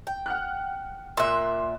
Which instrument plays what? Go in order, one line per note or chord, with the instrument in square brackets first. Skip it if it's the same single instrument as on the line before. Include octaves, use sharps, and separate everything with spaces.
[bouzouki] G5
[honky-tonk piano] F#5 F6 F#6
[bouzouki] A#2 E5 [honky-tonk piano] C6 F#6